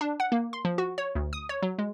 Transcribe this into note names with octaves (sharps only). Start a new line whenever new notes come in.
D4
F#5
A#3
C6
F3
F#4
C#5
D2
D#6
C#5
F#3
G#3